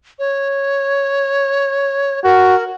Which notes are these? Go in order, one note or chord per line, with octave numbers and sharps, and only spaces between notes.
C#5
F#4 A#4